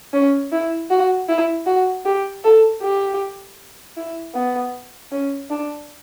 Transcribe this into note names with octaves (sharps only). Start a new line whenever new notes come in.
C#4
E4
F#4
E4
F#4
G4
A4
G4
E4
B3
C#4
D4